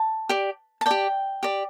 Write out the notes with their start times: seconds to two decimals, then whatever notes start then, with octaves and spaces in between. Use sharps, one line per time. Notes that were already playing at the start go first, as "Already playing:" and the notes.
Already playing: A5
0.29 G4 D5
0.81 A5
0.86 G4 D5 G5
1.43 G4 D5